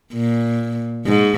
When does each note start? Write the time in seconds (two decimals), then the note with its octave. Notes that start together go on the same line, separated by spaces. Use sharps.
0.14 A#2
1.07 G#2